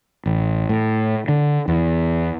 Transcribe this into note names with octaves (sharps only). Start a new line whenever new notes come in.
A1
A2
D3
E2